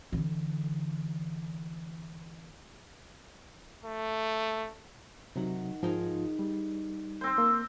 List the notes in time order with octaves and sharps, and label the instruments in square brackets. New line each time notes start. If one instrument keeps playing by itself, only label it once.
[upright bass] D3 E3
[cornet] A3
[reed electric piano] C3 F#3 [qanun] D#3 F#5
[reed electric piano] G#2 F3 F4 [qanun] D#4 G#4 A#4
[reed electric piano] G3
[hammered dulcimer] C4 C5
[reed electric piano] A#3